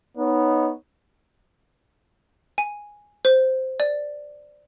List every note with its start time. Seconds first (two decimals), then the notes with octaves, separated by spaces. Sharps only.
0.17 B3 D#4 C#5
2.58 G#5
3.25 C5
3.80 D5